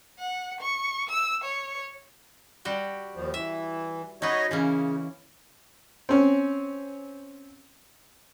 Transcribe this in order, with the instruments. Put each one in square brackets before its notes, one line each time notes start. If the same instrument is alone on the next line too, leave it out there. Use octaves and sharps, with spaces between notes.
[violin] F#5
C#6
E6
C#5
[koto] G3 F#4 G5
[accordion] D#2 F3
[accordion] E3 [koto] E5
[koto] D#4 B4 [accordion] F#4 C#5 D#5
[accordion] C#3 [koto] E3 A#3 C#4
[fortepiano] C4 C#4